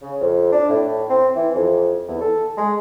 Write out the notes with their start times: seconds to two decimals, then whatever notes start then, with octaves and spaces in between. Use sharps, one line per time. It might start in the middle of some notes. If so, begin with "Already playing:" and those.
0.02 C#3
0.21 F2
0.52 D4
0.69 A2
1.09 C4
1.36 E3
1.55 F2
2.08 E2
2.21 A4
2.57 G#3